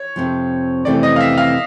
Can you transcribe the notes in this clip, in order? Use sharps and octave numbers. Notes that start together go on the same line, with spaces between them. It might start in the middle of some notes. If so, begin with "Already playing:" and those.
Already playing: C#5
F2 C3 F3
F2 C3 E3 A3 C#4 D5
D#5
F5
E5
F5